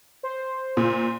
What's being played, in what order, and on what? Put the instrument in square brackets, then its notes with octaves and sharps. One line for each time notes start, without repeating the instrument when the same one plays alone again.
[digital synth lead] C5
[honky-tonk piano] A#2